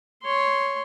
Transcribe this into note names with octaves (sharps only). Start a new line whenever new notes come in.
C#5 C6